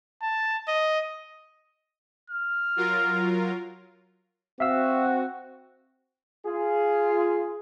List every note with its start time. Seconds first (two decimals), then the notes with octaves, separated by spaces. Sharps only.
0.22 A5
0.68 D#5
2.30 F6
2.76 F#3 F4 A#4
4.60 C4 F#4 E5 F5 E6
6.45 F4 G#4